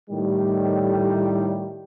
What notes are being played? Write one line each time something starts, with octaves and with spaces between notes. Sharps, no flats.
A2 D#3 G3